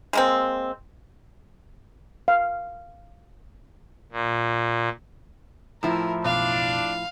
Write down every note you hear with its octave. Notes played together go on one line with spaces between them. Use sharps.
G#3 A#3 C4
F5
A#2
A2 F3 E4 A#4
F#1 B1 B2 D4 F5